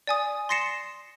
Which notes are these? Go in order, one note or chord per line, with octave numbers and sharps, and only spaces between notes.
D5 G#5 D#6
C6 A6 A#6 C7 C#7 E7